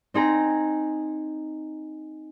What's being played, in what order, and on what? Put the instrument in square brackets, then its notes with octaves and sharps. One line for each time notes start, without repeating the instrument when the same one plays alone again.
[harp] C4 D#4 G#4 A#5